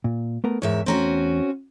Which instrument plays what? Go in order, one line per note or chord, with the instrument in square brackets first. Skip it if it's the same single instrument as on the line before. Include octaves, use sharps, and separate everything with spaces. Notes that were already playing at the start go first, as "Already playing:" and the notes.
[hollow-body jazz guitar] A#2
A3 B3 A#4
[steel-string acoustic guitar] E2 G#2 E5 [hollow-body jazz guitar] A#4 C#5
[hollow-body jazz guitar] E2 A3 A#5 [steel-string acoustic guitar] C4 C#4 F#4